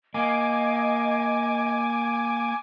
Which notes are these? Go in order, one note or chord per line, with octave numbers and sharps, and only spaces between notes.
A#3 D#5 G#5 D6